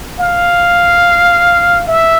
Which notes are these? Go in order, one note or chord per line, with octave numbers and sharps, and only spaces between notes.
F5
E5